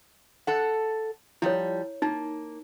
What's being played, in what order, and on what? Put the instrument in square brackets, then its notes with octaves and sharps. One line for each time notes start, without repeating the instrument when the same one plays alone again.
[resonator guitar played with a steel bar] A4 F#5
[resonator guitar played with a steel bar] F3 G3 [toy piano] E4 C#5
[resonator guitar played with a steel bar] A#3 [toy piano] D#4